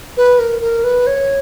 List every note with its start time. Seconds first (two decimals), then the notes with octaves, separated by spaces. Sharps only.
0.17 B4
0.39 A#4
0.61 A#4
0.84 B4
1.07 C#5